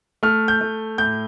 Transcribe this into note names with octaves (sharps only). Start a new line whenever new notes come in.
A3 F6
G6
A3
A2 G6